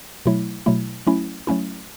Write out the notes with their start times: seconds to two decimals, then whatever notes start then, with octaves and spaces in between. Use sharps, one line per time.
0.26 B2 F#3 A3 E4
0.66 B2 F#3 A3 E4
1.07 F#3 A3 C#4 E4
1.47 F#3 A3 C#4 E4